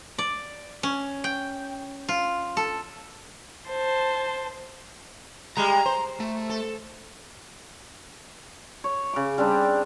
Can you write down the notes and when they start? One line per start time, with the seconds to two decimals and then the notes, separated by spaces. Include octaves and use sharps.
0.18 D5
0.83 C#4
1.24 G5
2.08 F4
2.57 A4
3.70 C5 A5
5.57 G3 G#3 A#5
5.86 C5
6.20 A3
6.49 A4
8.84 C#5
9.13 C#3 D6
9.38 G3 C4 D4